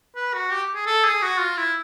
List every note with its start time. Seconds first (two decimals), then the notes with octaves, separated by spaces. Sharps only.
0.16 B4
0.34 F#4
0.51 G4
0.75 G#4
0.86 A4
1.04 G#4
1.22 F#4
1.40 F4
1.57 E4